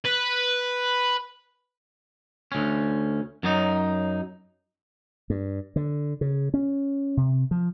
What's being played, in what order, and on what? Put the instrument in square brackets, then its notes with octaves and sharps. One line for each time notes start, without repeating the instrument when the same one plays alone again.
[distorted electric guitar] B4
[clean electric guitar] D2 C#4
F#2 F#3 D#4
[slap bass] G2
D3
C#3
C#4
C3
F3